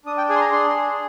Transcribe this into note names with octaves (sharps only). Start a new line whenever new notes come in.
D4 D#6
G5
G#4 G#5
C6
A#5
D4 C6
G#4